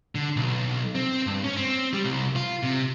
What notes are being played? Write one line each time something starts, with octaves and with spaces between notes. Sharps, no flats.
D3
B1
C4
G2
C#4
C4
G3
C2
F4
C3